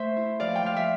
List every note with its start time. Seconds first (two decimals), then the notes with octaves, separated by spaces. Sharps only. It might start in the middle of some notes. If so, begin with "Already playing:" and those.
Already playing: A3 C5 E5
0.16 E4
0.40 F3 D5 F5
0.56 G5
0.64 F3 F5
0.76 E5